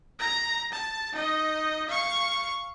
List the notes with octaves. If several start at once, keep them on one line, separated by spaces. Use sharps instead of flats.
A#5
A5
D#4 D#5
F5 C#6